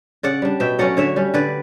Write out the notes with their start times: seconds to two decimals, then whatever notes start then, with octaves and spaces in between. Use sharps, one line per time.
0.23 C#3 D5 F#5
0.42 G3 D4
0.60 B2 E5 G5
0.79 F#3 A3 C#4 D5 F#5
0.97 D3 C#5 E5
1.16 G3 C#4
1.34 D3 B4 D5